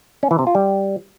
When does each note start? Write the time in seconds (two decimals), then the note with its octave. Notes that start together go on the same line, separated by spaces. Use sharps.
0.23 C#4
0.31 E3
0.39 C3
0.47 F4
0.55 G3